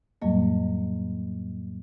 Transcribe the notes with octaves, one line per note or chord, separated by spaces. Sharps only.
F2 A2 F#3 G3 A#3 D#5